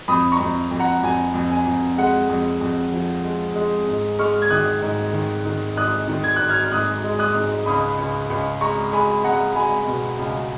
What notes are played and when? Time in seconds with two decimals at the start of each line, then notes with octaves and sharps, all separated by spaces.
0.08 F2 B5 D#6
0.32 A#5 C#6
0.39 F2
0.71 F2
0.80 F#5 A#5
1.03 F2 G#5
1.34 F2
1.50 G#5
1.66 F2
1.98 G#3 F#5
2.29 F2
2.61 F2
2.92 F3
3.24 G#3
3.55 G#3
3.87 G#2
4.19 G#3 C#6 F6
4.42 G#6
4.50 D#3 D#6 F#6
4.82 G#2
5.13 D#3
5.45 D#3
5.77 G#2 D#6 F#6
6.08 D#3
6.24 G#6
6.36 G#2 F#6
6.49 F6 G#6
6.71 G#2 D#6 F#6
7.04 G#3
7.19 D#6 F#6
7.35 G#2
7.66 C#2 B5 D#6
7.97 C#2
8.30 C#2
8.61 G#3 A#5 C#6
8.92 G#3 G#5 B5
9.24 G#3 F#5 A#5
9.55 G#3 G#5 B5
9.87 B2
10.19 C#2